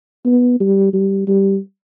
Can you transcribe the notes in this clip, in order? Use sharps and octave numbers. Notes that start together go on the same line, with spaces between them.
B3
G3
G3
G3